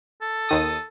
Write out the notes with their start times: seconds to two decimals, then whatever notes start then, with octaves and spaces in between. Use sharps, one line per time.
0.21 A4
0.49 D#2 D#3 D#6